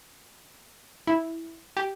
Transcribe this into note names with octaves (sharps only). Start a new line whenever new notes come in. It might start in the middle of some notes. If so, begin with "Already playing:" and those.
E4
G4